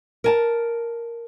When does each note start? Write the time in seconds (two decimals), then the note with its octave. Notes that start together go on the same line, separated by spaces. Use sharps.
0.24 A#4 G#5 A5